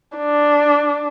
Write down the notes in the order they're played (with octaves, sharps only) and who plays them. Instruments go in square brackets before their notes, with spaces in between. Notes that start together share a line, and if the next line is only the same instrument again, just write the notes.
[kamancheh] D4